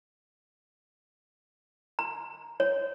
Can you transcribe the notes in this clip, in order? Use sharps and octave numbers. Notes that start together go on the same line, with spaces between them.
A#5
C#5